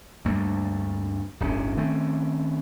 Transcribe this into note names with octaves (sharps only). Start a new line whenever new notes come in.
D2 G2 A3 A#3
D1 G1 C3 C#4
D#3 A3 C4 C#4